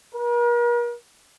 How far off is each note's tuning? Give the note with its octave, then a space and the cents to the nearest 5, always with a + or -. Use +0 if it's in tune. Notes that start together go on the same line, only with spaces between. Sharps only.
A#4 +45